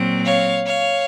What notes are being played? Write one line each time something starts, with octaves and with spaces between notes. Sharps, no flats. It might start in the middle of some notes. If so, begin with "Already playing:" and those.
Already playing: A#2 F#3 C4
C#5 F5
C#5 F5